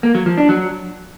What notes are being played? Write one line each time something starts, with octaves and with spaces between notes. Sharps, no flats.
A#3
F#3
F3
D4
F#3